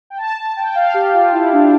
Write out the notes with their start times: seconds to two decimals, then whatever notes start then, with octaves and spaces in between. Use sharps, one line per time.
0.10 G5
0.18 A5
0.38 A5
0.57 G5
0.75 F5
0.94 G4
1.13 F4
1.32 E4
1.53 D4